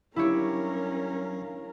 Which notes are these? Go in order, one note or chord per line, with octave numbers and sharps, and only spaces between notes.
G2 F#3 C#4 E4 G4 A#4 C#5 F5